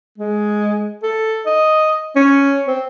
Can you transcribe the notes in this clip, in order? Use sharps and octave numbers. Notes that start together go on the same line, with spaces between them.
G#3
A4
D#5
C#4
C4